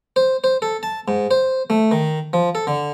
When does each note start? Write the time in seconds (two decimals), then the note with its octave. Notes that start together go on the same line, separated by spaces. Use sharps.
0.16 C5
0.44 C5
0.62 A4
0.83 A5
1.08 G#2
1.31 C5
1.70 A3
1.91 D#3
2.33 F3
2.55 A4
2.67 D3